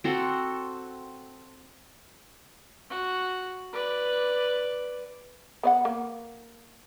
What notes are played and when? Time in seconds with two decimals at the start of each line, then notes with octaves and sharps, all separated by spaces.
0.04 C4 F#4 A4
2.90 F#4
3.72 B4 D5
5.63 B3 D5 F#5
5.85 A#3